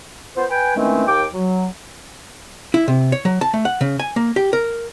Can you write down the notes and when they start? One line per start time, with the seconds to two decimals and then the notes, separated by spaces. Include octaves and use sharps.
0.37 B3 F4 C5
0.50 B4 G5 G#5
0.77 D#3 E3 G#3 A3 C4 C#4
1.07 D#2 G5 D6
1.34 F#3
2.74 E4
2.88 C3
3.12 C#5
3.25 F#3
3.41 A5
3.54 A3
3.65 F#5
3.81 C#3
3.99 G#5
4.16 A#3
4.36 G4
4.53 A#4